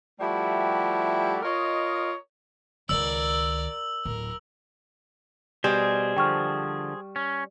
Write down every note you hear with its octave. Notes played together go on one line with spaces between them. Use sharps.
F3 G3 A3 E4 F#4 G4
F4 A#4 C#5 D#5
C#2 D#3 A#4 D5 E6 F#7
D1 A#4
B2 G3 G#4 C5
D3 F3 G5 C#6 F6
C#4